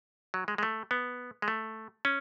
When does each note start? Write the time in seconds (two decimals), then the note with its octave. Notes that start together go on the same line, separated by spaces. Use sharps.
0.34 F#3
0.48 G#3
0.58 G#3
0.63 A3
0.91 B3
1.42 G#3
1.48 A3
2.05 C#4